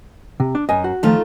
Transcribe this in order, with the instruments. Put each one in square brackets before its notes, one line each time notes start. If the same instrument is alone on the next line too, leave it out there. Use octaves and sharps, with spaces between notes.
[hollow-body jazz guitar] C3
D4
[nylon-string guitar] F#2 [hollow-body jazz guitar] D#5 G#5
[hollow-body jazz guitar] F#4
[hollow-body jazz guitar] D#3 F3 [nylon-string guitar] A3 D#4 F4